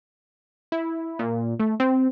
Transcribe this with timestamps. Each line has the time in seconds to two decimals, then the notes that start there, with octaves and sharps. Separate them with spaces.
0.72 E4
1.19 A#2
1.60 A3
1.80 C4